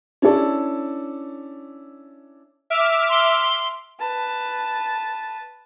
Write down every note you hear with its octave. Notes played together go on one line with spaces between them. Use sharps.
C#4 D4 E4 A4 D5
E5 D6 F6
C6
B4 A5